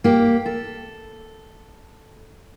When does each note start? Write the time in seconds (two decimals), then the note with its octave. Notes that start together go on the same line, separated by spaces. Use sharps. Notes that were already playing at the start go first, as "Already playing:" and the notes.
0.04 A#3 G4
0.46 A4